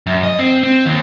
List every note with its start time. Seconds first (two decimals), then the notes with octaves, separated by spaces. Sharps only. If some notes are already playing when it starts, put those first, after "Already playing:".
0.07 F#2
0.24 D#5
0.39 C4
0.63 C4
0.86 D#2